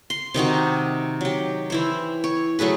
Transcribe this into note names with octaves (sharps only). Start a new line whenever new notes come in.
C6
C3 D#3 D#4 F#4
F#3 G4
E3 E4 C5
C#5
F#3 A3 G#4 B4